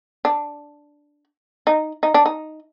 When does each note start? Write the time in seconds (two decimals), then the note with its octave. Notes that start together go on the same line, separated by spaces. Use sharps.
0.25 D4
1.67 D#4
2.03 D#4
2.14 D4
2.26 D#4